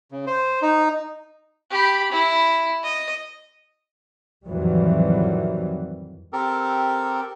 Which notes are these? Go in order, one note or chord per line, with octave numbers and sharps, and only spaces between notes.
C#3
C5
D#4
G4 B5
E4
D#5
F2 A2 D#3 E3 F#3 G3
C4 G4 A4 A#4